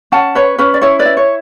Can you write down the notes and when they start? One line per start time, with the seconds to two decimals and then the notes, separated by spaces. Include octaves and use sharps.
0.12 C#4 F#5 A5
0.35 B4 C#5
0.58 C#4 B4
0.74 D5
0.81 E4 C#5
0.99 B4 D5
1.05 E4
1.17 C#5